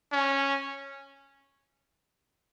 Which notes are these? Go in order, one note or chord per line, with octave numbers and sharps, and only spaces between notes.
C#4